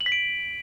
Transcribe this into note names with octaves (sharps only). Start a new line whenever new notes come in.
F#7
B6
D7